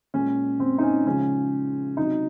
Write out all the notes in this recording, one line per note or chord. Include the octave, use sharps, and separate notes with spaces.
A#2 G#3 C#4
C4
D#4
C#4
C#3 F3 G#3 C#4
C3 F#3 D#4